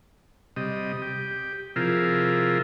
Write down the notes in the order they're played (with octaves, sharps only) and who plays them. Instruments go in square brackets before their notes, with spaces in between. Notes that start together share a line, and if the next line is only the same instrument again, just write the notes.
[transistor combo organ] C3 G3 D#5
G4
C3 F3 E4 F4 G#4 A#4